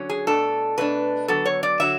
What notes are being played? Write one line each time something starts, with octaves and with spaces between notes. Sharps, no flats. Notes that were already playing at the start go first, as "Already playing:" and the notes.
Already playing: D3 F#3 C#4
G#4
B2 A3 D4 A4
B2 A3 D4 B4
D3 F#3 B3 A4
C#5
D5
D3 F#3 E5